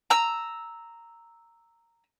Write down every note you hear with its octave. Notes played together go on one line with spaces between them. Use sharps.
A#5 E6